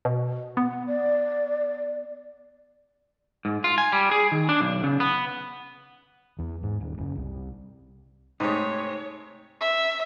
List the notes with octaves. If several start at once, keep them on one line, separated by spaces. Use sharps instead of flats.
B2
B3 F#5
D5
G#2
F4
G#5
G3
G#4
D#3
D4
B1
C#3
B3
E2
G#2
D#1
F#1
C2
G#2 C3 A3 D#4 C#5
E5